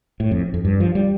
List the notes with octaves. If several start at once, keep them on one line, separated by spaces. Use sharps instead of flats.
A2
F2
F2
G2
F3
G3